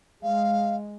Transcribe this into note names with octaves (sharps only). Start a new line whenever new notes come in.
G#3 F5